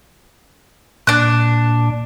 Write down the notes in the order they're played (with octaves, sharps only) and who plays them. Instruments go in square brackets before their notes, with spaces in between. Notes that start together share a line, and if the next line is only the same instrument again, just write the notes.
[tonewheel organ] A#2 [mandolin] D4 F#6